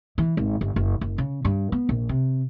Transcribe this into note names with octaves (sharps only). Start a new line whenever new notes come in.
E3
G#1
G1
F#1
F#1
C#3
G2
B3
A#1
C3